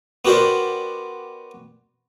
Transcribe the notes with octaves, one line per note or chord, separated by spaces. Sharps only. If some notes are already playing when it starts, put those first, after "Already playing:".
B3 F#4 G4 A#4 C5 D5